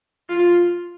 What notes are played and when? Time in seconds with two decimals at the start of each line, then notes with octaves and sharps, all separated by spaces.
0.29 F4